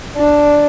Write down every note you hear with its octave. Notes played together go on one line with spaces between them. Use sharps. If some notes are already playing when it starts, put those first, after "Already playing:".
D4